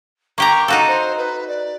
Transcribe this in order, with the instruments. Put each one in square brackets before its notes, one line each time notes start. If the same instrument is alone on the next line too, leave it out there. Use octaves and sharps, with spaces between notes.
[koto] A#3 G4 A#5 [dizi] C#6
[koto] D#4 F#4 A4 [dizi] F5
[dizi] C5
B4
D5